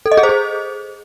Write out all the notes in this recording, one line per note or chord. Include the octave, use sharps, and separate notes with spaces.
A4
D#5
G#4
C5
G#4